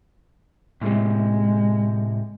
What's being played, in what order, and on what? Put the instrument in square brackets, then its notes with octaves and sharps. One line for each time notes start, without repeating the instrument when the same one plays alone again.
[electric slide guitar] A2 C3 [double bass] G#3